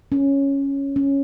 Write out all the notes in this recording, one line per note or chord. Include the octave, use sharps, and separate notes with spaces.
C#4
C#4